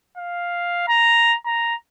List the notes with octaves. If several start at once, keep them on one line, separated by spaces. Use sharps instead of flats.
F5
A#5
A#5